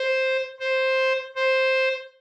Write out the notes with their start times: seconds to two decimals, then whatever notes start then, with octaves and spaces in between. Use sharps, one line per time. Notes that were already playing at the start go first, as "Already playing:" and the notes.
Already playing: C5
0.60 C5
1.36 C5